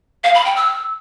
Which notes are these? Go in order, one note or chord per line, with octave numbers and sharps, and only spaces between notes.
F5
B5
G5
E6